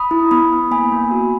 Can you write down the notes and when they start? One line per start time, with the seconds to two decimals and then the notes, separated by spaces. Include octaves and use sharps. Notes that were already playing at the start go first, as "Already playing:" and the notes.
Already playing: B5 D#6
0.11 E4
0.31 B3 B5 D#6
0.52 B3
0.71 A#3 G#5 B5
0.92 A#3
1.11 F#4